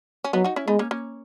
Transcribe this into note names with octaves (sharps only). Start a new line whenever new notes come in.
C#4
F#3 B3 D#4
D#4 F#4
C#4 E4
G#3 B3 D#4
A#3 C#4
A#3 C#4